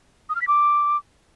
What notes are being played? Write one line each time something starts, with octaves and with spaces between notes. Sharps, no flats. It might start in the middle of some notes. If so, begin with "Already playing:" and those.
D#6
F6
B6
D6